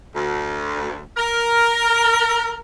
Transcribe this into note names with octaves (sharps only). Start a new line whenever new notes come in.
D2
A#4